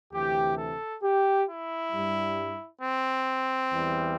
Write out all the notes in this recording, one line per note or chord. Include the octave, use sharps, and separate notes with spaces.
D2 C3 E3 G4
A4
G4
E4
G2 G3
C4
E2 E3 G3